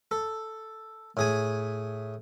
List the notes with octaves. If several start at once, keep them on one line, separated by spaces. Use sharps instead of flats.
A4
A2 G#4 G#5